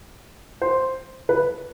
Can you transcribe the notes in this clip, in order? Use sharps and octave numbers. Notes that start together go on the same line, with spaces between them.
C5
B4